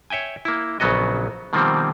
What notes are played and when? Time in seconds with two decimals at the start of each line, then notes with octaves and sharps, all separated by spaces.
0.10 C#5 E5 G5 G#5
0.45 A#3 E4
0.80 A#1 C#3 F#3 B3 F#4 D#5
1.53 B2 D#3 F3 G3 A#3 C4